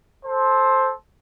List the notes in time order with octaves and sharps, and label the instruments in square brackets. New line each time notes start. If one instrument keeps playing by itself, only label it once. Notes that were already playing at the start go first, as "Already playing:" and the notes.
[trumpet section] A4 C5